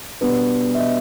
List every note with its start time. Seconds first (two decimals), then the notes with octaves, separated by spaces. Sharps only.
0.21 B2 G3 B3 D4 B4
0.75 E5
0.79 D#5